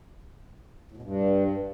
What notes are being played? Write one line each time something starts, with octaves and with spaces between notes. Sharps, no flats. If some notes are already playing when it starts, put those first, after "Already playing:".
A2
B2
G2